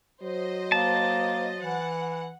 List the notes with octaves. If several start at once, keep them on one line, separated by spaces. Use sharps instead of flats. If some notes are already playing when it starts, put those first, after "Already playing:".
F#3 C5 D#5
A#3 A5
E3 F#5